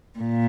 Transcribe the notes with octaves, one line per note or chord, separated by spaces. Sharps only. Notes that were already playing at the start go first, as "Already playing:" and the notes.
A#2